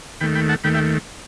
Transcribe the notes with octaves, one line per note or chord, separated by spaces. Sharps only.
D#2 D#3 A3 G5 B5
G5 B5
F#5 A5
D#2 D#3 A3 G5 B5
E5 G5